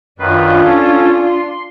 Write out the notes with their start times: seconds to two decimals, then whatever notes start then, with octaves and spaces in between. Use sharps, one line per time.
0.19 F#2 D#3 D4 F4 B4
0.64 C#4 A4
1.26 C6